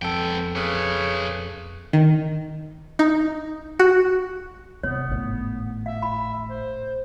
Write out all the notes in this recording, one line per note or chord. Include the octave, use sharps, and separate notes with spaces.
F2 B3 A4 G5
C#3 B4 C#5
D#3
D#4
F#4
C3 B3 C#5
G#1 A2
E5 F5
B5
C5